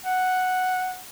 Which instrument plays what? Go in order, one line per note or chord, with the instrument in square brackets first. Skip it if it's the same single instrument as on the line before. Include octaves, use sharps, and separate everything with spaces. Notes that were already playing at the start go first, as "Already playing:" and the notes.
[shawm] F#5